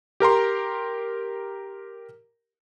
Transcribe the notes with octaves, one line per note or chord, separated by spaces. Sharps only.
G4 A#4 A#5 C6